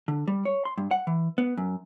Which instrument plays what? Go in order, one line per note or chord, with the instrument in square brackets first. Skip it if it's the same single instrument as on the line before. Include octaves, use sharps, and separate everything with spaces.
[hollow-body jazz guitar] D3
G3
C#5
C6
G2
F#5
E3
B3
F#2